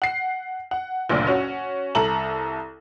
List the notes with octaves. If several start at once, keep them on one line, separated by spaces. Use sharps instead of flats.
F#5 C7
F#5
F#1 D2 A#2 D5
C#4 F#4
C2 A4 A#5 F#7